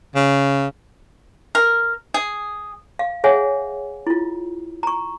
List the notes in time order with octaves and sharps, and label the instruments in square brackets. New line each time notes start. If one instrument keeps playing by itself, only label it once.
[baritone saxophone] C#3
[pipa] A#4
G#4
[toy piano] F5
G#4 C#5 E5 F#5 G#5
E4 F4
A#5 C#6